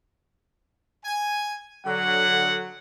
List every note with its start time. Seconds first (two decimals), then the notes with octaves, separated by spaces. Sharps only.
1.05 G#5
1.87 D3 F#3 F#5